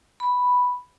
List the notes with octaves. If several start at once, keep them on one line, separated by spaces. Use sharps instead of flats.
B5